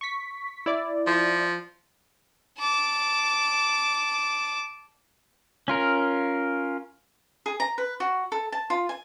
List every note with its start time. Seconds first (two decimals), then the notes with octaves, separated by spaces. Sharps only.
0.01 C#6 B6
0.66 E4 D5
1.07 F3
2.58 A5 D6
5.68 C#4 F4 A#4
7.46 G#4
7.60 A#5
7.78 B4
8.00 F#4
8.32 A4
8.52 A5
8.70 F4
8.89 G#5